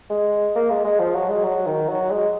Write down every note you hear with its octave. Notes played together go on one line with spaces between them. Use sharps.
G#3
A#3
G#3
G#3
F3
F#3
G#3
F#3
D#3
F#3
G#3